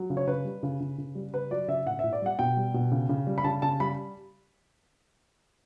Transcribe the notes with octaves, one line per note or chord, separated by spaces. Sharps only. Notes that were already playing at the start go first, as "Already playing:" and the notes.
Already playing: F#3
C#3
C#5
C#3 B4
G3
C#3
C#3
C#3
G3
C#3 B4
F#3 D5
C#3 E5
A2 F#5
A2 E5
D5
G3 F#5
B2 G5
G3
B2
C#3
C#3
G3
B5
C#3 A5
C#3 A5
G3 B5